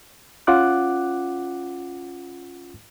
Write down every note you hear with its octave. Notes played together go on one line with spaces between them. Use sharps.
C#4 F4 F#5 D6 F#6